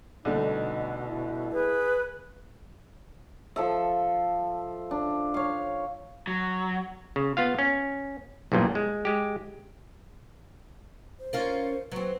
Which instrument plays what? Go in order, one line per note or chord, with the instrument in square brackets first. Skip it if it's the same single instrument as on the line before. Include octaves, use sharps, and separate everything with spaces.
[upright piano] C2 D3 A3 [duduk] B2 [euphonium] D#4
[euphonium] E4
[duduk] G#4 [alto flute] B4
[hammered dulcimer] F3 A4 E5
D4
C#5 F5
[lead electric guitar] F#3
[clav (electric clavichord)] C#3
B3 F4 F5
C#4
B1 E2 G2 A#2
G#3
G#3 G4
[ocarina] C5
[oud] C#4 F4 A#4
[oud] F#3 C4 [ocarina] B4